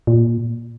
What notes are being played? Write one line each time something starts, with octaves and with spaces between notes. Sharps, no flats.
A#2